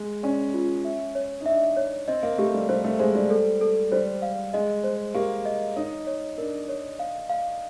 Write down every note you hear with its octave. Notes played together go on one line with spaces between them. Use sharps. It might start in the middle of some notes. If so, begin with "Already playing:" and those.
Already playing: G#3
C#4 D5
F4
E5
C#5
D#4
D4 E5
C#5
C4 D#5
A#3
A3 G4
G3
G3 C5
A3
G#3 C5
G3
A4
A4
G3 C5
F5
G#3 D#5
C5
A#3 G4
D#5
D#4 C#5
C#5
D4 A#4
C#5
F5
F5